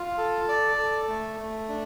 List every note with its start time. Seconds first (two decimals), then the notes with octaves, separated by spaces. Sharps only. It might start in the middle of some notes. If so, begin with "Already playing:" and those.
Already playing: F4
0.18 A4
0.49 D5
0.78 A4
1.08 A3
1.39 A3
1.69 D4